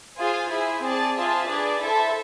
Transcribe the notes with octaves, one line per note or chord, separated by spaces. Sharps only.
F4 G#4 C5 G#5
E4 G#4 C5 G#5
C4 G#4 D5 A5
F4 G#4 C5 E5 A5
D4 G#4 B4 D5
E4 A4 C5 E5 A5